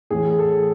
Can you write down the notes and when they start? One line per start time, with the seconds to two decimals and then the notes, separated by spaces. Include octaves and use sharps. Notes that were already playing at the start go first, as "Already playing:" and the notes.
0.10 A2 E3 G#4
0.39 A4